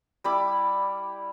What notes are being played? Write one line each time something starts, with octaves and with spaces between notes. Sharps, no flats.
G3 E4 B5 D6